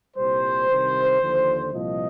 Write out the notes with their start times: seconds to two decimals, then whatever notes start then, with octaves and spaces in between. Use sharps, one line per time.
0.17 C2 A#2 G3 C5
0.69 C2 C3 D#3
1.20 D#2 D3 F3
1.72 C2 A#2 F3 D#5